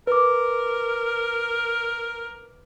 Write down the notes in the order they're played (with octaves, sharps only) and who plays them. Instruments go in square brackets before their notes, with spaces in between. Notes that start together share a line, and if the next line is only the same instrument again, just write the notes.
[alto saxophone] A#4 [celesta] B4 D6